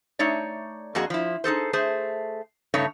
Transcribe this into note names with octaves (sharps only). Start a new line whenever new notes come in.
A3 D#4 C#5 D5
F2 A#3 F#4 G#4 D#5
F3 E4
D#4 G#4 A4 C5
A3 G#4 C5
G2 C#3 A3 D#4 C#5